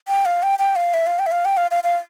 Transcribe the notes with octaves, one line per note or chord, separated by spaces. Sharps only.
G5
F5
G5
G5
F5
E5
F5
G5
E5
F5
G5
F5
F5
F5